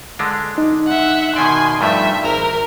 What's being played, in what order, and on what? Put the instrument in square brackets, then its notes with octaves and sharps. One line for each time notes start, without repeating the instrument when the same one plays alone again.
[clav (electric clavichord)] D3 G#3 D4
[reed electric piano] D#4
[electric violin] E5 F#5
[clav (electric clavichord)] B2 D#3 D5 [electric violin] G#5 C6
[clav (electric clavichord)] G2 F3 A3 [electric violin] E5
[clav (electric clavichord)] G#1 A#5 [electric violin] A#4